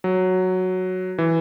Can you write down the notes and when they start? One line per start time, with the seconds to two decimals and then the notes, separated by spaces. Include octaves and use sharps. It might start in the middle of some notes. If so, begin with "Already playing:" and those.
0.04 F#3
1.18 E3